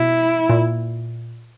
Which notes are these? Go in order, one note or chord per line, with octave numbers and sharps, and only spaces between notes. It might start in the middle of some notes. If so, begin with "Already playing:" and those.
Already playing: B2 E4
A#2